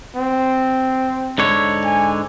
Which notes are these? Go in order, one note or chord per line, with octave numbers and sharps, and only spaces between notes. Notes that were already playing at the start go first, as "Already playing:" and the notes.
C4
G#2 D3 C#5
G#5